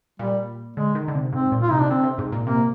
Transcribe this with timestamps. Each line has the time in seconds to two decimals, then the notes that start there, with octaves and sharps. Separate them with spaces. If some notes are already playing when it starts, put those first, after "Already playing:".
0.19 A#2 G3
0.76 D3 G#3
0.95 D#3
1.08 D3
1.15 C3
1.33 G#2 C4
1.52 A#2
1.62 F4
1.71 C3 D#4
1.80 D4
1.90 D3 C4
2.03 C3
2.18 G#2
2.32 A#2
2.46 C3 A#3